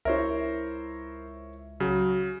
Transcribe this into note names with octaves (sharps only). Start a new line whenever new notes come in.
C#2 E4 A#4 C5 C#5 E5
C#3 F#3